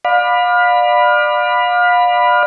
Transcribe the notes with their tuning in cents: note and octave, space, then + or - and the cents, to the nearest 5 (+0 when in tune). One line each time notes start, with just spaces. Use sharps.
D5 +25 F5 +35 B5 +0